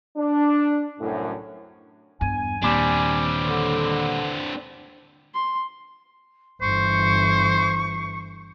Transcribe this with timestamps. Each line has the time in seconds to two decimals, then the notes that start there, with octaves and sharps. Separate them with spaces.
0.17 D4
1.00 C2 F#2 A2
2.21 E2 G2 G#5
2.62 D#2 A#2 G3 C4 D4
3.45 D3
5.34 C6
6.61 G1 E3 C5 C#6